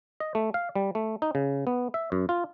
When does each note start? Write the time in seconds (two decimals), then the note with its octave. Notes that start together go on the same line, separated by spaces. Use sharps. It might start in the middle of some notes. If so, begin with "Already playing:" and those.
0.20 D#5
0.35 A3
0.54 F5
0.75 G3
0.95 A3
1.22 D#4
1.35 C#3
1.67 B3
1.94 E5
2.12 F#2
2.29 F4